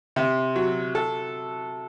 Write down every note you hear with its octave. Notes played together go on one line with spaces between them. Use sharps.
C3
F#3
A4